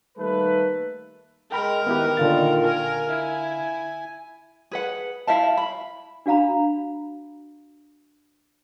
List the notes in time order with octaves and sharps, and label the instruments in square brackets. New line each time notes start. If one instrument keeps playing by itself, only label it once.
[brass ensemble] D#3 G3 A3 A#3 A4 B4
[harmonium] G#3 [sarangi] A#4 [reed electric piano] G5 B5 F6
[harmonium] D#3 B4 [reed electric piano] B3 E4 G4
[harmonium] A#2 D#3 [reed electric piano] D3 F5 A6
[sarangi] A#4 [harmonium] G#5
[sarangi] E4
[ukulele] G#4 B4 F#5
E4 E5 F5 A5
B5
[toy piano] D4 F#4 F5 A#5 B5